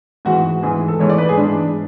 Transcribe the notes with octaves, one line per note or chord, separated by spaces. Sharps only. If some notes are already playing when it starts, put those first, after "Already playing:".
G#2 E3 F#4
G#2 E3 G#4
A4
G#2 E3 C#5
D5
B4
G#4
G#2 E3 D4